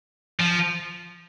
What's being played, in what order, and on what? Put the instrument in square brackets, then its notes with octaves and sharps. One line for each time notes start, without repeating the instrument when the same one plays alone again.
[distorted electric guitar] F3